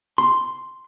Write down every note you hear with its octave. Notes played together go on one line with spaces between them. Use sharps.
C6